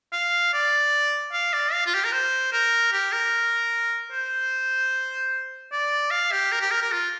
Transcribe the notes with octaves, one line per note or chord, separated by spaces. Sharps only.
F5
D5
F5
D5
F5
F4
G4
A#4
C5
A#4
G4
A#4
C5
D5
F5
G4
A#4
G4
A#4
A#4
F4